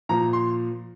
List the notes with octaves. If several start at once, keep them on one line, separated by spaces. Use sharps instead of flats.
A#2 F3 A#5
C6